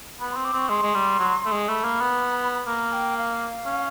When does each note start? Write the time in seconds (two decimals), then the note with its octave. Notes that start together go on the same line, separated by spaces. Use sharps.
0.20 B3 B5
0.32 C4 C6
0.44 D6
0.53 C4 C#6
0.69 G#3 C6
0.83 G#3
0.95 G3
1.19 F#3
1.45 A3
1.52 G#3
1.68 A3 B5
1.85 A#3
2.01 B3
2.67 A#3 A#5
2.92 G5
3.17 F5
3.66 C#4